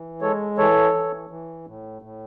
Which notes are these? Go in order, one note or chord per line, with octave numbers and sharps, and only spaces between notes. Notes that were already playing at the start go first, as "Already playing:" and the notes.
Already playing: E3
G#3 A4 C#5
E3 A4 C#5
E3
E3
A2
A2